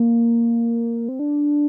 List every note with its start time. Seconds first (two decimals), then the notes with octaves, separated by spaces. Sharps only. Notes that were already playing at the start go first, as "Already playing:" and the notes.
Already playing: A#3
1.09 C4
1.19 D4